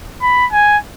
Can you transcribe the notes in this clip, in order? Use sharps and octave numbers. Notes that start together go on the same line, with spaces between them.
B5
G#5